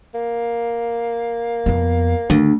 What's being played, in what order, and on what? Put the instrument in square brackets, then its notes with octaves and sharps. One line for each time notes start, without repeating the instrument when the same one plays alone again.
[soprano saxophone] A#3
[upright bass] F2 B3
[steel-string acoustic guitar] D2 [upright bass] D#3